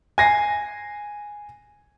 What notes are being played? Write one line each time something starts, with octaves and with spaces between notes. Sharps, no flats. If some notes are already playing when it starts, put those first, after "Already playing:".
G#5 A#6 C7